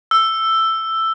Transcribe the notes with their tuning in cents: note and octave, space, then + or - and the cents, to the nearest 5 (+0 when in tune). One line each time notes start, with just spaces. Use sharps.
E6 +5